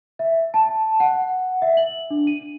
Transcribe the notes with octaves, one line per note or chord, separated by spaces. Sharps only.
E5
A5
F#5
E5
F#7
D4
D#7